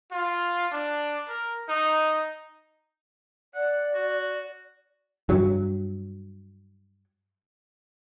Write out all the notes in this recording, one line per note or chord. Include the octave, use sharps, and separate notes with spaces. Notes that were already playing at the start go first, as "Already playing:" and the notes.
F4
D4
A#4
D#4
D5 F#5
F#4
G2 F#3